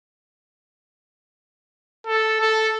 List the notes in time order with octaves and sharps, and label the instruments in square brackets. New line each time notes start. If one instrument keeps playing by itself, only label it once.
[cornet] A4
A4